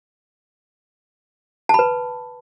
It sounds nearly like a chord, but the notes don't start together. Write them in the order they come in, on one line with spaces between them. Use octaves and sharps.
A5 B5 B4